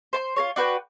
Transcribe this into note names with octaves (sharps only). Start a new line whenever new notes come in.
C5 A5 C6
F4 A#4 C#5
D4 F#4 B4 G5